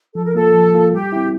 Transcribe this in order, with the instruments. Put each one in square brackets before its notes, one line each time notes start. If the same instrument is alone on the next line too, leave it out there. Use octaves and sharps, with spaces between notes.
[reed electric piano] F3 [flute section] A4
[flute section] A#4
[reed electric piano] A#3 F4 [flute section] A4
[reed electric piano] F3
A#3 F4
[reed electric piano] G3 [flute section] G4
[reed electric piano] C4 E4